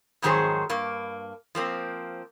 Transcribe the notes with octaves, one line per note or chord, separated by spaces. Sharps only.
F2 G#2 D#3 F#3 G#4 C5
G2 A#3
F3 A#3 C4